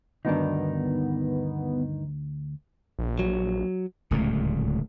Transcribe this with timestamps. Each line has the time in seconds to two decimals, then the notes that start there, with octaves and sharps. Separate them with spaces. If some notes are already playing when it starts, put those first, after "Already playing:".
0.25 D2 G2 D#3 B3 D4 D#4
2.99 A#1
3.19 F#3
4.11 D1 C#2 A#2 A3